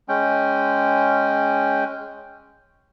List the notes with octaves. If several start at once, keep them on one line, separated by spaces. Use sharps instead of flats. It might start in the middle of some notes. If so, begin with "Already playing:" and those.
G#3 C#4 G5